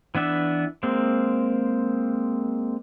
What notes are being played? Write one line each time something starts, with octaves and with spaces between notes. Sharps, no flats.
E3 B3 D4 E5
G#3 A#3 C4